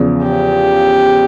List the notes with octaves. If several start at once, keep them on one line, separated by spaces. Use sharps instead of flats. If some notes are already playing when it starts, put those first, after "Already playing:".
Already playing: E2 C#3 F3
G4